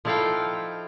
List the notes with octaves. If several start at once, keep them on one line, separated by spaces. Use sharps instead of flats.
F3 D#4 E4 A4 F5 G5